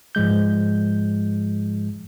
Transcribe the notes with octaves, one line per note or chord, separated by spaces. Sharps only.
G#2 F3 G#3 G6